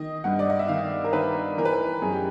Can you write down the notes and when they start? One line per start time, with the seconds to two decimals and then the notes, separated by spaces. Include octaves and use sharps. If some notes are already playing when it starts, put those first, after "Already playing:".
Already playing: D#3 D#5
0.24 G2 F#5
0.39 D5
0.50 D#5
0.59 E5
0.68 D#3 F5
1.04 A#4
1.13 D#3 B4
1.58 E3 A#4
1.65 B4
1.73 A#4
2.02 F#2 G#4
2.12 G4